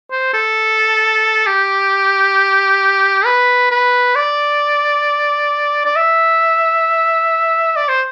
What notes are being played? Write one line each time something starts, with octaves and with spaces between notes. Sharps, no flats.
C5
A4
G4
B4
B4
D5
D5
E5
D5
C5